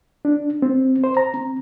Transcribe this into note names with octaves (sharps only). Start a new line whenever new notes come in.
D4
C4
C5
A#5
C4